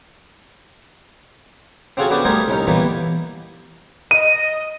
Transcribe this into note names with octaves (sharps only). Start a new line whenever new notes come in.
C4 C#4 F4 F#4 G#4 A4
B3 D4 F#4 G4 A4
G3 A3 A#4 C5 G#5 D#6
C2 C#4 D#4
B2 E3 G3 A#3 B3
D#5 D#7